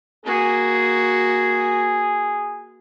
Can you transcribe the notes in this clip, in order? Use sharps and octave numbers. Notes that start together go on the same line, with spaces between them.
A#3 F#4 G#4